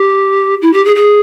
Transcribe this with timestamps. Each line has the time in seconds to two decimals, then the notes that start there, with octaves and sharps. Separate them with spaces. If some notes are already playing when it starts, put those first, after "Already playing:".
Already playing: G4
0.61 E4
0.73 G4
0.85 G#4
0.95 G#4